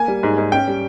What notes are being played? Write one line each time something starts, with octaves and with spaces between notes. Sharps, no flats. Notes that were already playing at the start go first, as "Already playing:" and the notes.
Already playing: A#3 G#5
G3
G#2
G#2
C#4 G5
G3